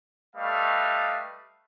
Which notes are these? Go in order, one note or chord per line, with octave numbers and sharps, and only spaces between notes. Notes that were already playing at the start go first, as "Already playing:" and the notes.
G3 A3 B4 D#5 F5